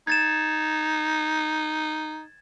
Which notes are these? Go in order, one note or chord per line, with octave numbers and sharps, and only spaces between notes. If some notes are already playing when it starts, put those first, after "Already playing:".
D#4 G#6 A6 E7